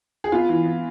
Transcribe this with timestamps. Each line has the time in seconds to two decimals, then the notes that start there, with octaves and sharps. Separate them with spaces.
0.24 G#4
0.32 B3 F4
0.49 E3
0.66 B3